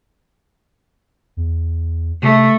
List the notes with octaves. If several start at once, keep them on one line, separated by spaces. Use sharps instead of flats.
E2
C3 A3